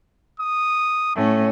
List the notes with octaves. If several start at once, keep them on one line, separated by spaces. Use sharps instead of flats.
D#6
A2 A3 C#4